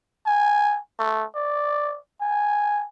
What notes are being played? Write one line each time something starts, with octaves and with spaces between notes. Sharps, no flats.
G#5
A3
D5
G#5